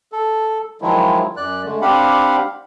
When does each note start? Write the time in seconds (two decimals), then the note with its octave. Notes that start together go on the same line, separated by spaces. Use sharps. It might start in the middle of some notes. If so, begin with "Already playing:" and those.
0.12 A4
0.82 D#3 F3 F#3 G#3 E4
1.37 F#2 D5 F#6
1.65 D3 G#3 A3
1.81 C4 D4 G4 F5 F#5 B5